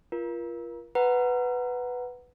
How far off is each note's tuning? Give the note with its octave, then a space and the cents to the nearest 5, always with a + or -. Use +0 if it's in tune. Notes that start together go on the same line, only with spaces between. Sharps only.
F4 -25 A#4 +35
B4 +5 F#5 +0 A#5 +0